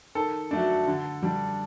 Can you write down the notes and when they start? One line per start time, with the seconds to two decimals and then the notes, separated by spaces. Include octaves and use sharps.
0.15 D#3 A4
0.51 F#3 A3 D4
0.87 D3
1.23 G3 D4